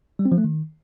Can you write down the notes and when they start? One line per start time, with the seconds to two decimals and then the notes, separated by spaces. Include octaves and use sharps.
0.19 G3
0.25 C4
0.32 F3
0.38 A3
0.44 D#3